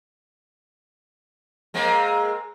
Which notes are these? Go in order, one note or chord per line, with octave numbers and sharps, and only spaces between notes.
G#3 A#3 C4